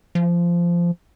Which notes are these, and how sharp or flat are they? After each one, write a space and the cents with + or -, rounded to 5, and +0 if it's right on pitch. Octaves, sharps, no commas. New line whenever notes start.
F3 -15